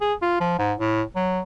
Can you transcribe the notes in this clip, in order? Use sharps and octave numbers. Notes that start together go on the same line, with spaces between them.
G#4
F4
F3
G#2
A2
F#3